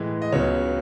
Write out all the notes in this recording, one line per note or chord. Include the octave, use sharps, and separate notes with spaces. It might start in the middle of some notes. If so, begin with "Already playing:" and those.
Already playing: A2 E3 G#3 D#5
D#5
C#2 C#3 F#3 B3 C#5